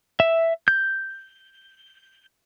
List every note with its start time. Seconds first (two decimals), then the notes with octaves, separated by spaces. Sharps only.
0.20 E5
0.68 G6